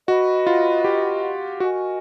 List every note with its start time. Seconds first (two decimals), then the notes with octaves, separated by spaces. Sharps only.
0.08 F#4 B4 D#5 F#5
0.47 F4
0.84 G4
1.60 F#4 A#4 D#5 G#5 C#6